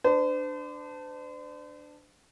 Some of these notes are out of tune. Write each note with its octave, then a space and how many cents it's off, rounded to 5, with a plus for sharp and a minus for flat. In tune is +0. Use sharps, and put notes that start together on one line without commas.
D4 +10 C5 -40